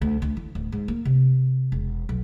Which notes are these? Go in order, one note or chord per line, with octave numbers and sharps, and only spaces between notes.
D2
D2
E3
D1
G#2
A#3
C3
E1
B1